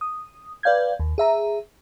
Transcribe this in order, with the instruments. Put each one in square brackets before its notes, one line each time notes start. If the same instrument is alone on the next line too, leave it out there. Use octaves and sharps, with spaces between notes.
[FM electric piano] D#6
B4 D5 F5 G6 G#6
D#2
G#4 E5 A#5